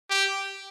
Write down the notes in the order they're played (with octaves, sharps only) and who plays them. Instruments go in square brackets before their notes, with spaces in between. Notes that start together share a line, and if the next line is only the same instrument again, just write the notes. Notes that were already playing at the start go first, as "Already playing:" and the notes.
[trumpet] G4